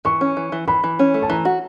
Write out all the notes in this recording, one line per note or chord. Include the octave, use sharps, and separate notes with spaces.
E3 C#6
C#4
E3
E3
E3 B5
E3
C#4
A3
A5
E3 A#5
F#4